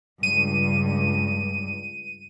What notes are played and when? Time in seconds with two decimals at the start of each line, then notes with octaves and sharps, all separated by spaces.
0.23 C#2 G2 D#7